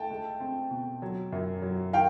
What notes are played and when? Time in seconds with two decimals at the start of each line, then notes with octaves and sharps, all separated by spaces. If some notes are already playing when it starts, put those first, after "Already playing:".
Already playing: A3 G5 A5
0.10 G#3
0.40 C4
0.70 B2
1.02 F#3
1.32 F#2
1.62 F#3
1.93 D#3 F5 G5